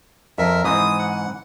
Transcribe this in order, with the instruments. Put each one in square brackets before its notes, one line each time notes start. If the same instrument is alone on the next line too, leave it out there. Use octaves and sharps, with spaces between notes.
[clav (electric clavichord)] F2 [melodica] A#4 E5
[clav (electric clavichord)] G#2 E3 C4 [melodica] D#6
[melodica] F#5